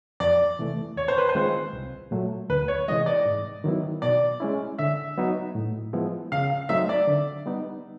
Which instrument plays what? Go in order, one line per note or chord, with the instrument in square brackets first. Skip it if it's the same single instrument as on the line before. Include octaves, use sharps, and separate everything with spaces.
[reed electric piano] F2 [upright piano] D5
[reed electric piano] C3 E3 A3
[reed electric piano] D#2 [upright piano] C#5
[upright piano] C5
B4
C5
[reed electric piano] D#3 G#3 C4 F4
C2
A#2 F#3 A3
[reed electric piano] D2 [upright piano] B4
[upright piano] C#5
[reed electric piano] C3 E3 G#3 [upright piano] D#5
[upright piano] D5
[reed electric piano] G#2
D#3 F#3 B3 E4
[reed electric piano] B2 [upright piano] D5
[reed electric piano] G#3 C#4 E4
[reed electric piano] D3 [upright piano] E5
[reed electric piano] F#3 B3 D#4 F#4
A2
F3 G#3 B3 E4
[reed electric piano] C#3 [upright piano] F5
[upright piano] F5
[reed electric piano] F#3 A3 C4 D#4 [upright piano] E5
[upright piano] D5
[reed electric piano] D3
G3 B3 D#4